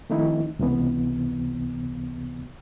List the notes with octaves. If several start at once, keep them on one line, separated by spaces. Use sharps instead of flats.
D#3 F3 A3 C4 D#4 E4
C#2 C3 E3 B3